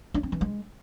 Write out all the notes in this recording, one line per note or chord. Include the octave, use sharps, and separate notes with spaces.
D4
C4
E3
G#3